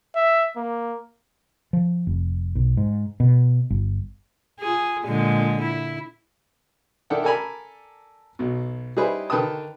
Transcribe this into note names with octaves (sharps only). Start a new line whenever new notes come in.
E5
A#3
F3
F1
B1
G#2
B2
G1
F4 G#4
A#2 D3 G#3
E4
D#3 D4 E4 A4 F#5 G5
A4 A#4 D5 G#5 A#5 B5
B1 B2
G3 D#4 E4 G#4 B4 C5
D3 D#3 B4 G5 A5 D#6